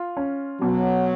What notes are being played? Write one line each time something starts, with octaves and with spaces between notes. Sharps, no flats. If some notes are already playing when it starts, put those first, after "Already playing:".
Already playing: F4
C#4
B2 F#3